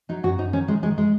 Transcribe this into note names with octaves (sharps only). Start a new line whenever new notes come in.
F#3 D#4
F#2 F#4
F#2 D#4
D#3 C#4
D#3 G#3
D#3 G#3
G#3